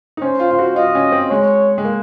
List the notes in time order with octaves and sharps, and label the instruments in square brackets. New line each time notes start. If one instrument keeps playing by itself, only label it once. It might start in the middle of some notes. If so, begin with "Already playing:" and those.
[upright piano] D#4
[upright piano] C#4 [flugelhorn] C5
[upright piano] F4
F4
F#4
[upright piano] F4 [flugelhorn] D#5
[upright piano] C#4
C4
[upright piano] G#3 [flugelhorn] C#5
[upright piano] G#3
A#3